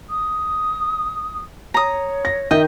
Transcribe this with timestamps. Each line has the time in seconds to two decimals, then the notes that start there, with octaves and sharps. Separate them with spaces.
0.09 D#6
1.74 C#5 A#5 D#6
2.25 A#6
2.51 D#3 D#5 E5 G5 G6